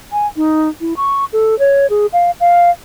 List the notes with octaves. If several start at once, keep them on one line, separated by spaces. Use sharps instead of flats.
G#5
D#4
E4
C#6
A4
C#5
G#4
F5
F5